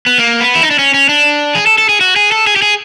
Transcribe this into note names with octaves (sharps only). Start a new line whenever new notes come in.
B3
A#3
B3
E4
D#4
D4
C#4
C#4
D4
G#4
A4
A4
G#4
F#4
G#4
A4
G#4
G4
G#4